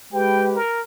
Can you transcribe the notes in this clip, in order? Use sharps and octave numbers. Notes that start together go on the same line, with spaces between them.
G#3 G4 B4 G5
A#4